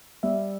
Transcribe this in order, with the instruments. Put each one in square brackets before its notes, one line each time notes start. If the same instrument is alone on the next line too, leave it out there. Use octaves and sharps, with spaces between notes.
[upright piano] G3 [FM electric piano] E5